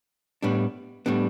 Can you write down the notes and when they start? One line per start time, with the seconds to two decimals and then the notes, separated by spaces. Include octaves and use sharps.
0.42 A2 G3 B3 D4
1.06 A2 G3 B3 D4